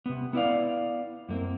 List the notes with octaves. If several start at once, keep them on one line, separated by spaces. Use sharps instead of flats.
C3 B3
B3 E4 D5 F5
F#2 A#3 C4